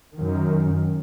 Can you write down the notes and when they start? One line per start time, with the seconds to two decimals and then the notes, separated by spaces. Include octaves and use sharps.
0.19 F#2 D#3